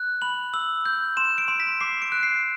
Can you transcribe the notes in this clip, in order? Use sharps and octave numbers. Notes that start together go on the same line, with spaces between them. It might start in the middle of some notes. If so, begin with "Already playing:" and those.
Already playing: F#6
B5 F#7
E6 F#7
G6
C6 E7
D7
C6
B6
D6 C7
D7
F#6
C7